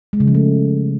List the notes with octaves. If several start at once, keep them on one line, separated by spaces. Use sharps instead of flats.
G#3
C#3
F3
A3